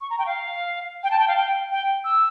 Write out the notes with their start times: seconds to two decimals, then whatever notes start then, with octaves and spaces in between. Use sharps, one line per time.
0.01 C#6
0.10 A#5
0.19 G5
0.26 F5
1.03 G5
1.11 A5
1.20 G5
1.28 F5
1.36 G5
1.71 G5
2.04 E6